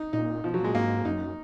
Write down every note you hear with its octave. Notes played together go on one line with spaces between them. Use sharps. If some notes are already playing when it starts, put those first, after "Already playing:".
Already playing: D#4
A#2 D#4
B2 F3
F#3
A#2
G#3
G#2 A#3
F#2 D#4